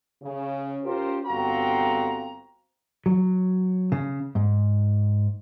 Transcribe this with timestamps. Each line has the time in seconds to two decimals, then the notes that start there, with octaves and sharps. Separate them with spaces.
0.23 C#3
0.83 C#4 F4 G4 A#4 C5
1.27 G1 C4 F#4 F5 G5 A#5
3.06 F#3
3.92 C#3
4.35 G#2